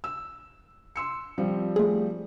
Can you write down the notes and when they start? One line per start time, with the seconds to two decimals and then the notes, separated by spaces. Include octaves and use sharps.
0.04 E6
0.96 C6 E6 C#7
1.38 F3 G3 C4
1.76 A3 G#4